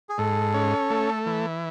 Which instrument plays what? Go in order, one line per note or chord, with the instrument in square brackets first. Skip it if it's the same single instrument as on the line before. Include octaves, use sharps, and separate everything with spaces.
[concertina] G#4
[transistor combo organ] G#2 [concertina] A4
[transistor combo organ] C#4
A3
E3